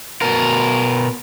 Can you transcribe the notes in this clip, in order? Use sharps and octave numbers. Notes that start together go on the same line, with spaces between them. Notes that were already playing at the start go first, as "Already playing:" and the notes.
B2 A#4